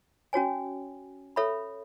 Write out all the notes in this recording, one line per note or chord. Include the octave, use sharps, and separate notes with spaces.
C#4 F#4 C#5 G#5
A4 C#5 E5 B5